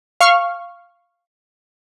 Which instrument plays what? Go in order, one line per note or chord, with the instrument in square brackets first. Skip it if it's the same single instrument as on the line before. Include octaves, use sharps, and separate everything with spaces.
[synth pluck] F5 C#6 F6